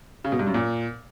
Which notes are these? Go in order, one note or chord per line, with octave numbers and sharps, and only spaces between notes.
C#3
B2
G2
F#2
A#2